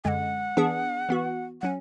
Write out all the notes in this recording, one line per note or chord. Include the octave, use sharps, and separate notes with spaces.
F#2 D3 G#3 F#5 G#5
E3 B3 D4 G#4
E3 B3 F#4
F#3 C#4 F#5